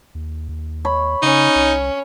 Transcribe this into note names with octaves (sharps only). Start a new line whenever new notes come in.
D#2
D#2
C#5 B5
C#3 C#4 D#4
C2